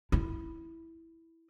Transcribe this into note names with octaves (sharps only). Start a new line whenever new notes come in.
E4